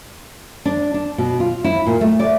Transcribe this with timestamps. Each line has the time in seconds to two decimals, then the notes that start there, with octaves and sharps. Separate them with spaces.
0.65 D4
0.94 D4
1.18 B2
1.40 F4
1.64 E4
1.87 A#2
2.01 A3
2.19 D5